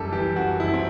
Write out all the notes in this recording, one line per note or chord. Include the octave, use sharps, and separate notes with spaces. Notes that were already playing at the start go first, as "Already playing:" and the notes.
Already playing: F#1 F#2 G3 G4 A4
E3 G4
F#2 F#4
F#1 E4
C4